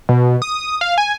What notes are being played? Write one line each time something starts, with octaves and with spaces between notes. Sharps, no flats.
B2
D#6
F5
G#5